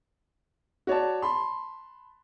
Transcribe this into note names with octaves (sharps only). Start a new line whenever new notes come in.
F#4 C#5 D5 A5
A5 B5 C6